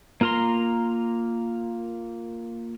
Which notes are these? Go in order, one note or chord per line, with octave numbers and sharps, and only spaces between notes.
A#3 F4 A#4 A#5 C6